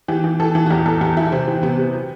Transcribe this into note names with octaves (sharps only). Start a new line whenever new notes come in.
E3 G4
E3
E3 A4
E3
F#4
E2 G4
E2 A4
E2 G4
F#3 E4
C3 C4
E3
C3 B3
C3
F#3